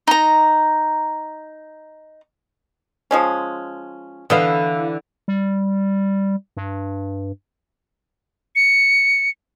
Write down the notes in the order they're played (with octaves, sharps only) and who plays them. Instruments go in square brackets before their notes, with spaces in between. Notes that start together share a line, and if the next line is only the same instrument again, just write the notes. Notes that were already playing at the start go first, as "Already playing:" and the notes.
[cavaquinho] D#4 A#5
[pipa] F3 G#3 C#4
[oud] D3 E3 [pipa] B3 F5
[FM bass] G3
G2
[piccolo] C#7